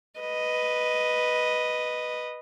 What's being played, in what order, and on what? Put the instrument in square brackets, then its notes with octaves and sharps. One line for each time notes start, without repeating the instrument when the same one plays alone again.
[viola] B4 D#5